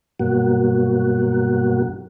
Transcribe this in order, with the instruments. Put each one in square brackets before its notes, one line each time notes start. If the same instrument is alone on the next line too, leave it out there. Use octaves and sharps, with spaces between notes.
[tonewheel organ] G2 B2 F#3 A#3 F#4